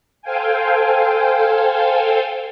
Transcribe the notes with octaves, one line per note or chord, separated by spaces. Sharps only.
A4 C5 F5 G5 G#5